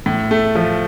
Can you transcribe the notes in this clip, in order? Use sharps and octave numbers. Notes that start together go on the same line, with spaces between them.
A2
A3
F3